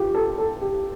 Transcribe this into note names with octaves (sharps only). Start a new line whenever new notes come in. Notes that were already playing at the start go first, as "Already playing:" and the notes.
Already playing: F4 G4
A4
A4
G4